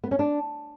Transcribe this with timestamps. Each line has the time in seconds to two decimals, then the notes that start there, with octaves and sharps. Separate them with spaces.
0.04 B3
0.11 C#4
0.19 D4